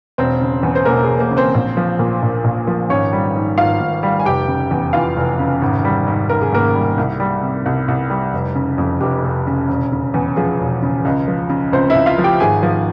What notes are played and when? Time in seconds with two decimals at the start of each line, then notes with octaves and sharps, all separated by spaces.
0.18 E1 C4 C5
0.41 C#3
0.63 E2
0.75 C5
0.85 E1 A#3 A#4
1.03 G#4
1.09 E1
1.20 A#3 A#4
1.31 C#3
1.37 C4 C5
1.54 A#1
1.77 F3
1.99 A#2
2.22 A#1
2.44 A#1
2.67 F3
2.90 G#1 C#4 C#5
3.13 G3
3.36 G#2
3.58 G#1 F4 F5
3.80 G#1
4.03 G3
4.20 G#5
4.26 F1 G4 G5
4.48 C#3
4.71 E2
4.93 E3 F4 F5
5.17 F1
5.39 C#3
5.62 G#1
5.85 G3
6.07 G#2
6.30 G#1 A#4
6.41 G#4
6.52 G#1 A#3 A#4
6.75 G3
6.98 C2
7.20 G3
7.43 C3
7.66 C2
7.88 C2
8.10 G3
8.33 F1
8.55 C#3
8.78 F2
9.01 F1 G4
9.24 F1
9.47 C#3
9.69 E1
9.92 C#3
10.14 E2
10.36 F3 G#4
10.60 E1
10.83 C#3
11.05 C#2
11.28 F3
11.50 C#3
11.73 C#2 C4 C5
11.90 E4 E5
11.95 C#2
12.06 F4 F5
12.18 F3
12.24 G4 G5
12.40 G#1 G#4 G#5
12.63 F3